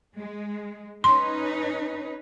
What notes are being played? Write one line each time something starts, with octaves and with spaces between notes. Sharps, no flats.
G#3
C#4 D#4 B4 C6